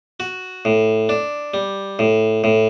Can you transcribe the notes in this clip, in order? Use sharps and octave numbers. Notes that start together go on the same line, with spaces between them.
F#4
A2
D4
G3
A2
A2